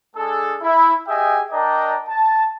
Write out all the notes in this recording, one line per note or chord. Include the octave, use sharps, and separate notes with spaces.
G#3 D4 G#4 A4
E4
G4 G#4 D#5 E5 G5 G#5
D4 A#4 D5 D#5 G5 A#5
A5